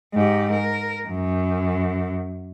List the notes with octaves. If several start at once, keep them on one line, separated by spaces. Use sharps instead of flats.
G#2 G4
A#4
F#2